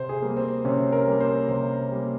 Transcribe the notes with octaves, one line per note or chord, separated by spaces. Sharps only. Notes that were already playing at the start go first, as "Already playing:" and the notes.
Already playing: C3 C5
G#4
G3 A#3
C4
C3 C#4
A#4
G3 A#3
C5
C3 C5
G3 A#3